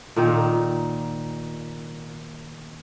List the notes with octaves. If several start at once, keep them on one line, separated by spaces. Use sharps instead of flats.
A#2 D#3